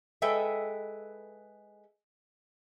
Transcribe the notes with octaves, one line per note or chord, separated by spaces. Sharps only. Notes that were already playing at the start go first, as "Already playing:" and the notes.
G#3 A4 B4 E5 G5